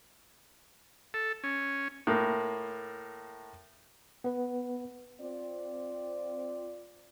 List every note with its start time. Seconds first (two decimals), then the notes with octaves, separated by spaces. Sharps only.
1.14 A4
1.44 C#4
2.07 A2 A#3
4.24 B3 B4
5.20 C4 F4 D5